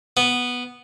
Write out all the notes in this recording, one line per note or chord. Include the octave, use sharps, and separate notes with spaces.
B3